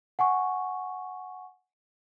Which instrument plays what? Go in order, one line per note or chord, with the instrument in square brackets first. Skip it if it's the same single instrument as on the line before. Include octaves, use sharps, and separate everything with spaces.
[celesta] F#5 G#5 C#6